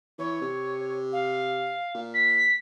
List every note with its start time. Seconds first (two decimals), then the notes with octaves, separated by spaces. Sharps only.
0.18 E3 C#5
0.41 C3
1.12 F5
1.95 A#2
2.14 B6